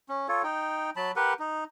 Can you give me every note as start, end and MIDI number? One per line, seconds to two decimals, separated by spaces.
0.09 0.27 61
0.28 0.42 65
0.28 0.42 69
0.28 0.42 73
0.44 0.90 63
0.44 0.90 79
0.96 1.12 54
0.96 1.12 81
0.96 1.12 83
1.16 1.33 67
1.16 1.33 70
1.16 1.33 71
1.16 1.33 78
1.39 1.64 63